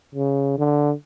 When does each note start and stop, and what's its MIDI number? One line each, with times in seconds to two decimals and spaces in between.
0.15 0.56 49
0.58 0.92 50